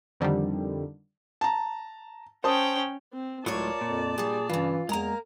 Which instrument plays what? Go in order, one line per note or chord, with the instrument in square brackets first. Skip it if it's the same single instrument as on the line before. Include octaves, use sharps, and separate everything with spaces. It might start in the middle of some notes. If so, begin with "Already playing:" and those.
[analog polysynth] F2 D3 D#3 G3
[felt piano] A5 A#5
[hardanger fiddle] C#4 G5 [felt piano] C5 A5 D#6
[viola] C4
[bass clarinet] C#2 [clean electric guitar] A2 F#3 [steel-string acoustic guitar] F4 A#4 C#5 [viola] D5 A5
[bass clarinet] F2 [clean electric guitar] A#2
[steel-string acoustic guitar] G2 G3 [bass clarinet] G#4
[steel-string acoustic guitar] G2 C#3 [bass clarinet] E3 [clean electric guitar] F4
[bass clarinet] E2 [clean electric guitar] G#3 A#5 [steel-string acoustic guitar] A#3 A#4